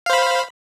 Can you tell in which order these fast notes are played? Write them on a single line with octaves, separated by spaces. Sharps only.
F5 C5 B5